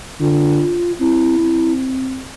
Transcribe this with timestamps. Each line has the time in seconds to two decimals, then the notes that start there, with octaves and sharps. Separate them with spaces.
0.20 D3 F4
1.00 C4 E4
1.40 C4